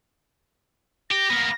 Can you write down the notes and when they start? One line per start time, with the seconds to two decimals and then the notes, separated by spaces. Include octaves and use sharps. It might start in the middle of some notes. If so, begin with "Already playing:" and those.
1.11 G4 A#6
1.30 A#3 B3